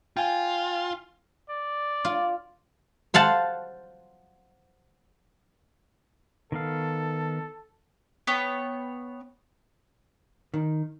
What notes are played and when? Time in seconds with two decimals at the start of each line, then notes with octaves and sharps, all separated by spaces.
0.17 F4 G5 G#5
1.50 D5
2.05 F4
3.14 C5 F5 F#5 A5
6.52 D#3 B3 A4 F5
8.27 B3 C#5 G5
10.54 D#3